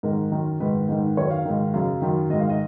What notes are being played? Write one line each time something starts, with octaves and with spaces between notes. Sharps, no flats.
G#2 D#3 A#4
F#2 D#3
G#2 D#3 B4
G#2 D#3
F#2 D#3 C#5
F5
G#2 D#3
F#2 C#3 F5
F#2 D#3
G#2 D#3 D#5
F5
D#5